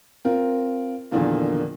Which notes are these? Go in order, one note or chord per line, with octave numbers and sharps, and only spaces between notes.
C4 F4 A#4
E2 A#2 D3 D#3 F3 A#3